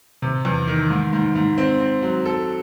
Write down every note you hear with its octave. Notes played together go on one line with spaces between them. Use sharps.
C3
E2
D#3
G#2
G#2
G#2
C4
C4
F#3
A4